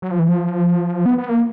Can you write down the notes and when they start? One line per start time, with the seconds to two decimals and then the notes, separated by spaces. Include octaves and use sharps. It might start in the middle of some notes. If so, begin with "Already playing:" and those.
0.02 F#3
0.11 F3
0.19 E3
0.28 F3
1.06 B3
1.18 B3
1.29 A#3